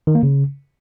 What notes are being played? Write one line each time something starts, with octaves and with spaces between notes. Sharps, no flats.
D#3
A#3
C#3